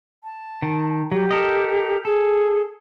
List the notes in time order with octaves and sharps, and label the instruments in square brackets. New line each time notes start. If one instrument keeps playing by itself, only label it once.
[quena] A5
[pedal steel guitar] D#3
[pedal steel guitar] F#3 [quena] G4
[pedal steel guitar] A4 A#4 D#5
[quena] G#4 [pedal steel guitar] A4